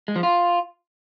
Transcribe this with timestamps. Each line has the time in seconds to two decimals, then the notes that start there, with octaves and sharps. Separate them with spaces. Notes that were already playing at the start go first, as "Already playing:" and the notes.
0.08 G#3
0.16 F3
0.23 F4